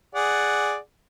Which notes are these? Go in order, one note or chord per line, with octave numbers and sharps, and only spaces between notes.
G#4 D5 F#5